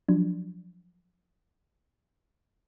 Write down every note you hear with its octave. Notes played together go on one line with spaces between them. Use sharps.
F3 F#3 D4